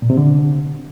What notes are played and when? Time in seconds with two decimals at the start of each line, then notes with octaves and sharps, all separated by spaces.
0.02 A#2
0.10 C3
0.17 D3